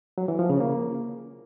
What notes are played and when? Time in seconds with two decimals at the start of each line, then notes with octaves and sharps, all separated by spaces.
0.18 F#3
0.28 E3
0.39 F3
0.50 C#3
0.60 A#3